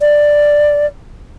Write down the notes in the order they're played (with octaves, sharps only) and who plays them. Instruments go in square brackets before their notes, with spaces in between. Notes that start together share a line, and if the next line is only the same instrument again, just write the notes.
[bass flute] D5